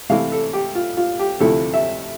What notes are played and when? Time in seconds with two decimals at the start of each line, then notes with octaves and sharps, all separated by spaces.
0.09 C3 E3 A3 E4 F5
0.32 A4
0.53 G4
0.75 F4
0.97 F4
1.19 G4
1.40 D2 C3 F3 A3 E4 A4
1.74 E5